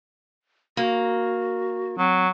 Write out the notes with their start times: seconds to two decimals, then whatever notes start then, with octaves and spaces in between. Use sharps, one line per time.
0.77 A#3 F#4
1.98 F#3 C4